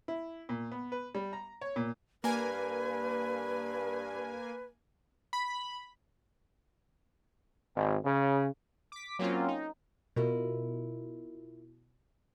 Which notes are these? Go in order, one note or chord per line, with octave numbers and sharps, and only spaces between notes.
E4
A#2
B3
B4
G3
A#5
C#5
A#2
G2 A#3 B4 G#5
B5
G#1
C#3
D6 B6
F#3 A#3 C4 C#4 F4
D#4
B2 E4 F4 A#4